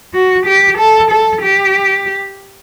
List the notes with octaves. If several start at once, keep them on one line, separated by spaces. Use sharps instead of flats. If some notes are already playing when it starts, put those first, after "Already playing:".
F#4
G4
A4
A4
G4